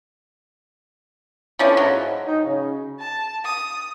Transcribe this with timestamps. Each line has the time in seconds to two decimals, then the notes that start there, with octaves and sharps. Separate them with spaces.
1.59 F3 A3 B3 C#4 D4 E4
1.77 G#2 F#3
2.27 D#4
2.44 C#3
3.00 A5
3.45 D#6